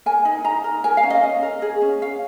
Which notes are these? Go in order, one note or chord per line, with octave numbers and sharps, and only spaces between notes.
A#4 G#5
D#4
D#4 A#5
A#4
A#4 G#5
F5
C#4
D#5
C#4
A#4
G#4
C#4
C#4 F5